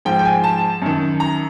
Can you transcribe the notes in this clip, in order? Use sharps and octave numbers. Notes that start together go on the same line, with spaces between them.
G#2 F3 G5
G5
G#5
A5
F#2 D#3
A#5